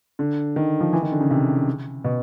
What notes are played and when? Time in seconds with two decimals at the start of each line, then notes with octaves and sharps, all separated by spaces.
0.19 D3
0.56 D#3
0.80 F3
0.93 E3
1.02 D#3
1.12 D3
1.21 C#3
1.31 C3
2.04 B2